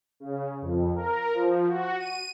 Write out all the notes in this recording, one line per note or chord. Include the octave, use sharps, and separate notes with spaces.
C#3
F2
A#4
F3
F#4
D#7